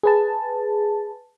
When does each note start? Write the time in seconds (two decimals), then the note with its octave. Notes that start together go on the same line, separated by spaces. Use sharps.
0.03 G#4 B4 A5